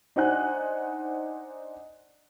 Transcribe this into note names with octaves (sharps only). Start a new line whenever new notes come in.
D4 D#4 C5 F#5 G#5 F#6